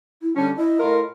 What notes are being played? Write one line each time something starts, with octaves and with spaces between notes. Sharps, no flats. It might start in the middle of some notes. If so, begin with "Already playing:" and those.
E4
D3 G3 C#4 A5
E4 D#5
A2 F4 A#4